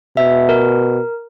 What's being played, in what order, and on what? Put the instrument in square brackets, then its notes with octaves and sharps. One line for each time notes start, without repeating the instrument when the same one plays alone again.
[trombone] B2 [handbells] E5
[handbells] A#4